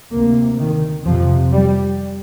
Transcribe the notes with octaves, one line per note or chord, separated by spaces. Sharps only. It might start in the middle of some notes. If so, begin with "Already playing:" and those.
D2 C3 A#3
D#3
F2 C3 F3
G3